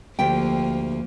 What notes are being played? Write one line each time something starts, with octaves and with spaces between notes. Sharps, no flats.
D2 F3 A#3 G4 G5